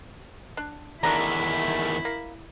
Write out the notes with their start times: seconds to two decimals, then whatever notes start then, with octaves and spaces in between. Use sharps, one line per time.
0.57 D4
1.03 E2 D3 D#3 D4 E4 A#5
1.53 A3
2.05 A#3